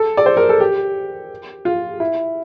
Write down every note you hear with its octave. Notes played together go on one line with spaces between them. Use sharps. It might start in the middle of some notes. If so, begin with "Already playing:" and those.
Already playing: A4
D5
C5
A#4
A4
G4
F4
E4